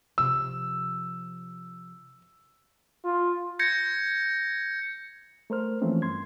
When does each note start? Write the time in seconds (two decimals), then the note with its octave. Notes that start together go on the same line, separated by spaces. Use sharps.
0.18 C3 F3 E6
3.04 F4
3.59 G6 G#6 A#6 C#7
5.50 A3 A#4 C5 F6
5.81 E3 F3 A3 A#3 C4 C#4
6.02 G2 C6 G#6